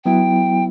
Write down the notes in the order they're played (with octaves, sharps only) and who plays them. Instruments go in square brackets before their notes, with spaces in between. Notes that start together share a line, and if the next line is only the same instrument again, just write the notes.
[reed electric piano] F#3 B3 E4 [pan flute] G5